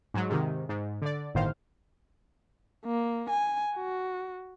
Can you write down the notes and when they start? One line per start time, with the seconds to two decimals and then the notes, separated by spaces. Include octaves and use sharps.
0.14 G#2 F#3
0.30 G#2 C3 D#3
0.69 G#2
1.02 D3 D5
1.35 G1 A2 D#3 C5 F5
2.86 A#3
3.30 G#5
3.76 F#4